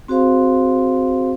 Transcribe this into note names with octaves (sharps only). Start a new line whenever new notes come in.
C4 F#4 G#4 C5 F5 C6